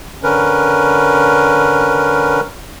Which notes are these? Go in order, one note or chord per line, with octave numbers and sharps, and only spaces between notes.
D3 C#4 A#4 B4